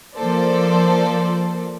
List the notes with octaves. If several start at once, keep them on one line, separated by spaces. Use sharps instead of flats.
F3 A#3 A4 C5 D5